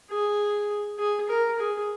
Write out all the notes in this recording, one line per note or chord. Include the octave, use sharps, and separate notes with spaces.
G#4
G#4
A#4
G#4